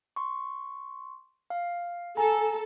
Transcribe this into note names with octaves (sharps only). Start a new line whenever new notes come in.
C6 C#6
F5
A4 G#5 A#5